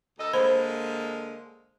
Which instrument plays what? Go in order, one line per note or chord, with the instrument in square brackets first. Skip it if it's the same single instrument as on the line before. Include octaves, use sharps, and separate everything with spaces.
[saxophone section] D2 A4 D#5
[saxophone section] D3 G#3 A#3 [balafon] C5 B5